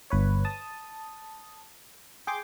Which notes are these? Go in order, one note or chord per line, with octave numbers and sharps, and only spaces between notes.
G1 B4 C#5
A5 D#6
G#4 G5 C6 D6